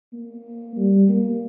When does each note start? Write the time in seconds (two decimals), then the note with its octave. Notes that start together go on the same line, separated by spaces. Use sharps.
0.13 A#3
0.77 G3
1.09 A#3